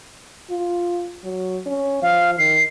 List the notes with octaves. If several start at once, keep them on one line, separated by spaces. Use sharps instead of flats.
F4
F#3
C#4
F3 F5
D#3 C7